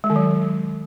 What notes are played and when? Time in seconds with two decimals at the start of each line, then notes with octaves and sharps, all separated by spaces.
0.04 G#3
0.10 D#3
0.16 F#3